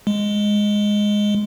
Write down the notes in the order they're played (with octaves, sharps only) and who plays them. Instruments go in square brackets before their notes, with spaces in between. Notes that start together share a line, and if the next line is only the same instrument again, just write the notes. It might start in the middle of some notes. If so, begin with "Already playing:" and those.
[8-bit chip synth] G#3